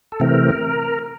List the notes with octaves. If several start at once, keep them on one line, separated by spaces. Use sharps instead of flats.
A4
C3 E3 A3 C4 A#4